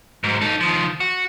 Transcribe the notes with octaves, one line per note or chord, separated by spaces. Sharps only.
G#2 F#3
D#4 A4
D#3 F3
F#4